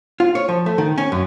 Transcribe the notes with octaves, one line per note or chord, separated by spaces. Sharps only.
F4
C#5
F3
A3
D#3
C#4
F#2